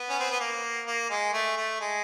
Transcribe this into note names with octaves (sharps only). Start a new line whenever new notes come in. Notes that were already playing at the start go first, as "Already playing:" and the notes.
Already playing: B3
C#4
C4
B3
A#3
A#3
G#3
A3
A3
G#3